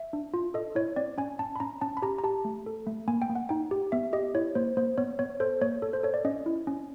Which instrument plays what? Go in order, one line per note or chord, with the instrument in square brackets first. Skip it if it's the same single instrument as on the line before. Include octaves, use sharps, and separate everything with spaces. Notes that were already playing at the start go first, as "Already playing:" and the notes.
Already playing: [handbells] E5
D4
F4
A4 D#5
E4 C#5
C4 D5
C#4 G#5
C#4 A5
B5
C#4 A#5
C#4 A5
B5
G4 A#5
A#5
G4 A5
A3
A4
A3
A#3 G#5
G5
A#3
F#5
D#4 G5
G4
B3 E5
G4 D#5
E4 C#5
A#3 C5
A#3 C5
B3 C#5
B3 C#5
A4 C5
A#3 C#5
A4
C5
A4 C#5
D5
C#4 D#5
E4
C#4